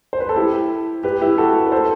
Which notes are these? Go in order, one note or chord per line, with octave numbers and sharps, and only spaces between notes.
C5
B4
A4
E4 G4
G4 B4
E4 G4
F#4 A4
B4
A4 C5